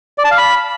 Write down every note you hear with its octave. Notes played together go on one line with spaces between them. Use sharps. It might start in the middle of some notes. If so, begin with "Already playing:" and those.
D5
A5
F5
B5